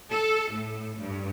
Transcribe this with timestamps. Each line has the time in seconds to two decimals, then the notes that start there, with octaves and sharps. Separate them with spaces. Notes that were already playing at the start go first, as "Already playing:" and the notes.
0.12 A4
0.53 A2
0.98 G2